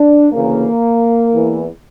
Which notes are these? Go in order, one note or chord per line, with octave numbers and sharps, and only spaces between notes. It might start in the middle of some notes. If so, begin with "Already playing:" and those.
Already playing: D4
D2 C#3 E3 A#3
E2 E3